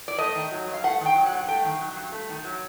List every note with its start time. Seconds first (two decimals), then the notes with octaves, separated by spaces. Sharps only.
0.08 D5
0.18 A3 D#5
0.35 D#3
0.51 F#3
0.67 G2
0.74 F5
0.83 A3 F#5
1.00 D#3
1.06 G5
1.15 F#3
1.26 F#5
1.33 G2
1.48 A3 G5
1.65 D#3
1.81 F#3
1.96 G2
2.12 A3
2.29 D#3
2.44 F#3